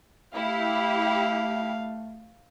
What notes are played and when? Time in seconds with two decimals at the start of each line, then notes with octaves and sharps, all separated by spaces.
0.35 A3 E4 G4 F5